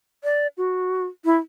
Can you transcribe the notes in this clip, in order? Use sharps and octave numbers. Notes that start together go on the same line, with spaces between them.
D5
F#4
E4